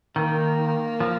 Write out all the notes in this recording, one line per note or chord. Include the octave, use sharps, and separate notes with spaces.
D#3 A#3
F3